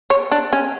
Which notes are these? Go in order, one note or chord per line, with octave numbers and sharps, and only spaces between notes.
C#5
D4
C#4